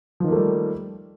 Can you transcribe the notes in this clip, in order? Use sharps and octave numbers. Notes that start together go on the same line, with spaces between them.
D#3 F3 G3 A3 A#3